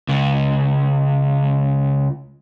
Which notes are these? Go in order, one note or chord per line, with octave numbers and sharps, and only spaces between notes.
C#2 C#3